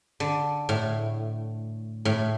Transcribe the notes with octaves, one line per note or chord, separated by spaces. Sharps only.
D3
A2
A2